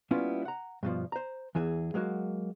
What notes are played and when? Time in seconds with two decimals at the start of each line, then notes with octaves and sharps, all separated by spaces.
0.11 G3 A#3 B3 C#4 E4 F4
0.45 F#5 A#5
0.83 G2 B2 F3
1.12 C5 A#5
1.55 E2 E3 G#4 E5
1.94 F#3 G#3 A#3 F#4